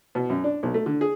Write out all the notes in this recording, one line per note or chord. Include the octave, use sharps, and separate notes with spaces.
B2
F#2
D4
B1
A3
D3
G#4